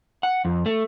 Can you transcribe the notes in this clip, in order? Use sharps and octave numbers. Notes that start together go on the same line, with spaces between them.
F#5
F2
A3